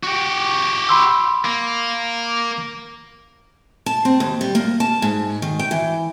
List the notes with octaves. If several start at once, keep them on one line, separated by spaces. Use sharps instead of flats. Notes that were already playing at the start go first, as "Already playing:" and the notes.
F#4 G4
B5 C6 E6
A#3
A5
C4
D#2
G3
A#3
A5
G#2
D#3
G5
E3